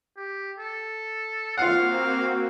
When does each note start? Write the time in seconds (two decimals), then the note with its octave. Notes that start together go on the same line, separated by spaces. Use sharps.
0.17 G4
0.58 A4
1.58 A#3 C4 F4 F#4 F5 F#5